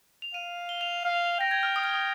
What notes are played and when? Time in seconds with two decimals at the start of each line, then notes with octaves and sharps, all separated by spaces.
0.22 F7
0.34 F5 D#7
0.69 G7
0.81 F7
1.05 F5
1.40 G5 A#6
1.51 G#6
1.63 F6
1.76 D#6
1.84 F6
1.94 D#6